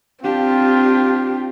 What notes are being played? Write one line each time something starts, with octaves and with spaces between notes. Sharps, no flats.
C4 D4 F4 G4